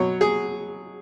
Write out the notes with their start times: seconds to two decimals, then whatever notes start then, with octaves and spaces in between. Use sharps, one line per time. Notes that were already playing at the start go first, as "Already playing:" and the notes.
Already playing: B2 F#3 C#5
0.21 G#4